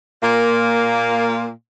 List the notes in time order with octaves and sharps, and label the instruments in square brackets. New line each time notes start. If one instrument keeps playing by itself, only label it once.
[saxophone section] A#2 A#3